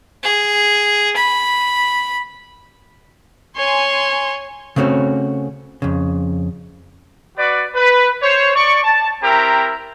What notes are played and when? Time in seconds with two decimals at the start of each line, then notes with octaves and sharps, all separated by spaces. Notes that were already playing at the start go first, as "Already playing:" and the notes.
0.23 G#4
1.16 B5
3.57 C#5 G#5 C6
4.76 C#3 A3 C4 C#4 F#4 C#5
5.82 F2 C#3
7.37 F#4 B4 D5
7.75 B4
8.22 C5 C#5
8.54 D5 C#6
8.84 A5
9.22 C4 E4 G4 A#4 A#5